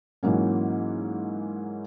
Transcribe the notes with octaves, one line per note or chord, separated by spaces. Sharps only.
G#2 E3 F#3 A#3 C#4